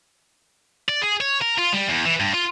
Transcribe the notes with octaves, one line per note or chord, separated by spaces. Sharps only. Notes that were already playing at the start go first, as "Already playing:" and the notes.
D5
G#4
C#5
A#4
F4
G3
E2
E3
G2
F4